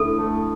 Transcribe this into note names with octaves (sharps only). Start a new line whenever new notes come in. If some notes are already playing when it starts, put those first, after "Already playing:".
Already playing: D2 D3 E4 A4
A3